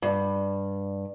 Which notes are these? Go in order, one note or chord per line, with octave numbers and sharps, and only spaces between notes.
G2